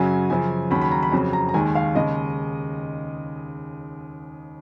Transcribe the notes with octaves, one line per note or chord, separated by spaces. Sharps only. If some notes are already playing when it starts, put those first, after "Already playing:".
Already playing: F#2 C#3 F#3 G#5
F#2 C#3 F3 G#5
D#2 C#3 F#3 B5
B5
A#5
B5
F2 C#3 F#3
A#5
A#5
D#2 D#3 G#3 G#5
F5
D#2 C#3 G#3 D#5